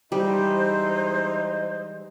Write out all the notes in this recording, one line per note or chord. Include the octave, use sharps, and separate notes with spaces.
E3 G3 G#3 D#4 C5